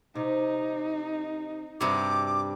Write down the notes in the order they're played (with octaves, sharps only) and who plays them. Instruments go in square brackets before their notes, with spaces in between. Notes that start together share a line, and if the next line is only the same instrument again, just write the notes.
[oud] C3 [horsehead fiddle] D#4
[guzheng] G2 C3 [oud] F#4 [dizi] D6